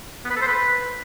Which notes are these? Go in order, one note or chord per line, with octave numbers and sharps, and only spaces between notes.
B3
B4
A4
C5
B4